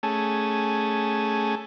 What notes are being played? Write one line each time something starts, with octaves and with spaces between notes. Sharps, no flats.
A3 C#4 G#4 A5